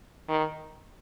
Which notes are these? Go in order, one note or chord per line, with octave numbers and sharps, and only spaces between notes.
D#3